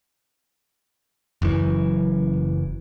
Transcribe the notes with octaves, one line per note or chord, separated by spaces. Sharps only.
F#1 F#2 E3